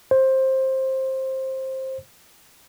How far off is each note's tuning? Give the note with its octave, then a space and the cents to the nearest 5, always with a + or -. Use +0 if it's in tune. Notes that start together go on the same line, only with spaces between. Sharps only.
C5 +15